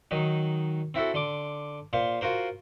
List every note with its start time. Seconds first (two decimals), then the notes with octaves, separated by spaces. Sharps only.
0.11 D#3 F#3 D#4
0.94 C4 E4 F#4 A4
1.14 D3 C6 D6
1.93 A#2 C5 F5 C6
2.21 F4 F#4 A#4 C5